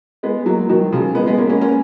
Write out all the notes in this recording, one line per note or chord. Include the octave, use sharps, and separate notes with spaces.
G#3 B3
F#3 A#3
D#3 F#3
C#3 F3
G#3 B3
G#3 B3
A#3 C#4
A#3 C#4
A#3 C#4